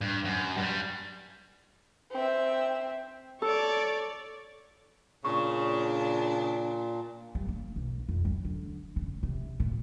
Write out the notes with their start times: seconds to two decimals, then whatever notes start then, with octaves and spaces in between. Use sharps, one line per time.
0.01 G2
0.25 F#2
0.57 G2 G3
2.12 C4 E5
3.42 A4 C#5 D5
5.25 A#2 C#3 D4 C#6
7.35 G3
7.48 A#3
7.76 B1
8.09 F2
8.25 F#3
8.45 D3
8.96 C#3
9.23 C3
9.60 A#2